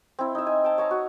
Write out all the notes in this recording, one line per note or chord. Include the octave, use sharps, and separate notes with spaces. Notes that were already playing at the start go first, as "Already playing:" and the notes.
C4 E4
D#4 E5
G#5
G5 A5
C#5 G#5 A#5
F#4